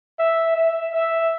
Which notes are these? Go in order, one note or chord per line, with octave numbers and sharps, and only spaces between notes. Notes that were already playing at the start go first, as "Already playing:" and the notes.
E5
E5
E5